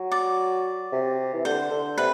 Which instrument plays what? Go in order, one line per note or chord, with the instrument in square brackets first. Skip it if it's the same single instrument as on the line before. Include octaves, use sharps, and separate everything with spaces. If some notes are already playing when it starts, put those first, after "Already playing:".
Already playing: [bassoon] F#3
[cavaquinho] D5
[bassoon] C3
E3
[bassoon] D3 [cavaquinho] C5
[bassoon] D3
[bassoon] C3 [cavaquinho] B4